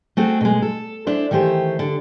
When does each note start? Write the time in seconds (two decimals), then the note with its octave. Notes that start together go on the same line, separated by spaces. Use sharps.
0.17 A3 C4 F#4 G#4
0.41 B2 G#3
0.62 A4
1.07 D4 E4 C5
1.31 D#3 E3 A3 G4 C5
1.79 D3